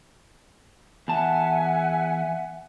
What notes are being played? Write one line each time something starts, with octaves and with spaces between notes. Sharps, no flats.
E2 E5 F#5 G#5 A5